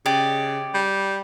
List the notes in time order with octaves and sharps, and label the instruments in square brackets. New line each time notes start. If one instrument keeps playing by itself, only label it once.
[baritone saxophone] C#3 [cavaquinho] G4 D5 D#5
[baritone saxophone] G3